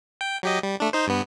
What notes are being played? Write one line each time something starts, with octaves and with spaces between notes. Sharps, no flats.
G5
F#3 G4 D#5
G3
A3 D4
D#4 C5
G2 B3